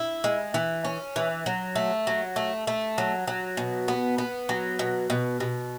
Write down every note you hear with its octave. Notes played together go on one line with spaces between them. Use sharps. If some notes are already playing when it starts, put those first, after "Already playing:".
Already playing: E4
G#3
E3
C#4
E3
F#3
A3
F#3
A3
A3
F#3
F#3
B2
B3
B3
F#3
B2
B2
B2